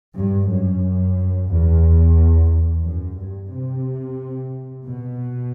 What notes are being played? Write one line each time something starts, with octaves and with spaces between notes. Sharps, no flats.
G2
F#2
E2
F#2
G2
C3
B2